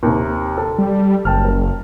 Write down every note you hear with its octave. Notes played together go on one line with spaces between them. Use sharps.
D#2 C3
A4
G3
F#1 G5 A5 F6
A#4